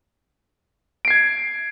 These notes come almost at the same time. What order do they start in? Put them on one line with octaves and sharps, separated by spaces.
D7 C7 G#6